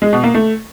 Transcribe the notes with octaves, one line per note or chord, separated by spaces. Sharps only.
G#3
B2
A#3
A3